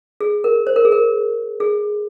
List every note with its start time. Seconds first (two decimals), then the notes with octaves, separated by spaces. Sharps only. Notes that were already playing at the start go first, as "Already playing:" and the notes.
0.21 G#4
0.44 A#4
0.67 C5
0.76 A#4
0.85 G#4
0.92 A#4
1.60 G#4